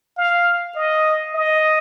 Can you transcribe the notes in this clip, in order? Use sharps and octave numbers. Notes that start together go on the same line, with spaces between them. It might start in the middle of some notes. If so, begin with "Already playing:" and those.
F5
D#5
D#5